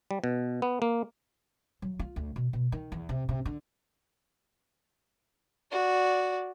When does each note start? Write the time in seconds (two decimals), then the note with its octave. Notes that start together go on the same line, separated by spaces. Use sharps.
0.11 G3
0.24 B2
0.62 B3
0.82 A#3
1.82 F#3
1.99 F4
2.16 D2
2.36 B2
2.53 B2
2.72 D#3
2.92 E2
3.09 C3
3.29 C3
3.46 D3
5.71 F#4 D5